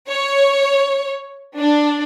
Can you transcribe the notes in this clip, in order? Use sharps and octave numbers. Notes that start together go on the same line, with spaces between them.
C#5
D4